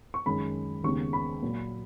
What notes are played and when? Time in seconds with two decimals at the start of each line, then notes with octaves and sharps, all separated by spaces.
0.14 C#6
0.26 F#2 D#3 G#3 C#4 B5
0.83 D#2 C#3 G#3 B3 C#6
1.13 B5
1.42 A#2 F#3 A#3